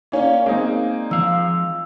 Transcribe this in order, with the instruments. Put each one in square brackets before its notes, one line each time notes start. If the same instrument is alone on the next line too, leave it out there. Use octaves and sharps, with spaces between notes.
[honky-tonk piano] A#3 C#4 [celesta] D5 F5
[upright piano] G#3 C4 D#4 [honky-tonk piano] A#3
[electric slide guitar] F3 F5 [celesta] E6